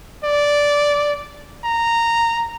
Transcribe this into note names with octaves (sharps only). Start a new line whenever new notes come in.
D5
A#5